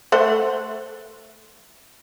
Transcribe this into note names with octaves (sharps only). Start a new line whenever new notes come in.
A3 C5 F#5